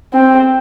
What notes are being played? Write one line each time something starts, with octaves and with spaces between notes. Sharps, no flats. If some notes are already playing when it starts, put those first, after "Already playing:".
C4